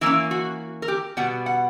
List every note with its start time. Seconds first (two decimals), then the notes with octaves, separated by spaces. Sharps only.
0.01 E3 A#3 C#4 E4
0.31 F#4
0.82 A#4
0.88 G4
1.17 B2 G3 B3 F#5
1.46 F#5